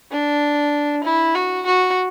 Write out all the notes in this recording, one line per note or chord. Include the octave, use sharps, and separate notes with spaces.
D4
E4
F#4
F#4